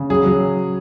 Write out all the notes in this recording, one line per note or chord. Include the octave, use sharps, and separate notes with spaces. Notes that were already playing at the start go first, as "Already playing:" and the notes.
Already playing: C#3
F#3 G#4
F#3